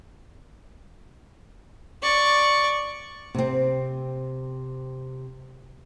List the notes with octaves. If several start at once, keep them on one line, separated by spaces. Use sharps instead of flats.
D5 C#6
C3 C4